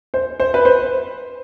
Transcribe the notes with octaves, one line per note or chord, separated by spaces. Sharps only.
C5
C5
B4
C5